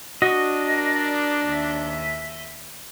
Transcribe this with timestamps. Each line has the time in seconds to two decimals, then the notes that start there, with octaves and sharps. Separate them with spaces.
0.22 D4 F#4 D#5
0.67 A#4 D5
1.45 D#2 E5